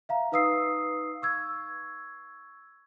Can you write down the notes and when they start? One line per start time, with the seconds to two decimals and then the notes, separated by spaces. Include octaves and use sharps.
0.09 E5 F5 A#5
0.32 D#4 B4 F5 D#6 E6 C7
1.22 C#6 E6 G#6